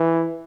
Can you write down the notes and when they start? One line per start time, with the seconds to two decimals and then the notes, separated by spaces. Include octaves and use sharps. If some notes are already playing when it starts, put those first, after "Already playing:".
Already playing: E3